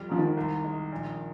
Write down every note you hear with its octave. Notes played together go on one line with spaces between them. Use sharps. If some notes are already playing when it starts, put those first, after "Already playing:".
Already playing: F2 G3
G#2 F3
D#3
C2
G#3
A#1